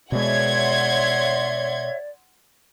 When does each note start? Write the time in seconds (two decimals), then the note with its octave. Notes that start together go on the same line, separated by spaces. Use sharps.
0.12 B2 G#3 C#5 D5 E5 F#5 C6 G#6